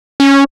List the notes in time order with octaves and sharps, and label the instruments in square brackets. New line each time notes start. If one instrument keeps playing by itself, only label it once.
[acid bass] C#4